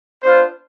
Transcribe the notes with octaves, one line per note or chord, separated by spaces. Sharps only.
B3 D4 F4 C5